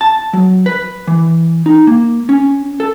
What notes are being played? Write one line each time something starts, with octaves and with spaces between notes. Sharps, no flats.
A5
F#3
B4
E3
D#4
A#3
C#4
A4